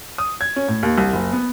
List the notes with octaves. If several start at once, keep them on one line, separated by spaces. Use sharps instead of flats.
D#6
G#6
C#4
A2
D#2
C2
F#1
B3